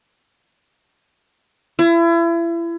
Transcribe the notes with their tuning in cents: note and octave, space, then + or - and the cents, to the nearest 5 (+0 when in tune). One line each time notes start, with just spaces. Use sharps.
E4 +35